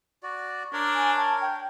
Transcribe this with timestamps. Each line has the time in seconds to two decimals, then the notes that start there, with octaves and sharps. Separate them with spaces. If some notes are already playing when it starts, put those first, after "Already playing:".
0.23 F#4 D5
0.73 D4 A#4 C#5
0.95 G#5
1.16 A5
1.41 G5